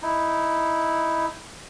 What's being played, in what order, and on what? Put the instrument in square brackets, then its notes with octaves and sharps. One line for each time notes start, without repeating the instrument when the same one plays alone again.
[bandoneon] D#4 E4